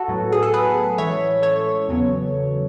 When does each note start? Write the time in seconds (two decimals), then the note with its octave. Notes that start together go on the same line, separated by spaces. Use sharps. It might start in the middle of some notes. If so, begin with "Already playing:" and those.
Already playing: F#4 A4
0.08 A2 F#3 B3
0.32 G#4
0.43 A4
0.54 G#4 B4
0.98 A2 E3 G#3 C#4 C#5 E5
1.42 A4 C#5
1.88 E2 C#3 F#3 B3